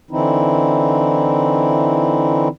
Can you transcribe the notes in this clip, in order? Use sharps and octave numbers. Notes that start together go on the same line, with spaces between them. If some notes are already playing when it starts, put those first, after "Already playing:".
D3 E3 C4 D#4 E4